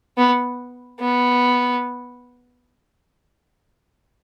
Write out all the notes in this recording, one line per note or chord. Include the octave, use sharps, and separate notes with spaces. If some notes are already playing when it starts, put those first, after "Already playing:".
B3
B3